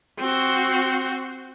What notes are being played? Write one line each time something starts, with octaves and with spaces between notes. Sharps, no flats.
C4 F#4